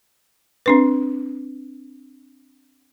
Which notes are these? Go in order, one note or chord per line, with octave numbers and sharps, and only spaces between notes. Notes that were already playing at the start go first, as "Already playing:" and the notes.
C4 D4 B4